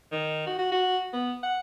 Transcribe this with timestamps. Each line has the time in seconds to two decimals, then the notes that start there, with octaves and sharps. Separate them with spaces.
0.12 D#3
0.47 F#4
0.58 F#4
0.72 F#4
1.13 B3
1.43 F#5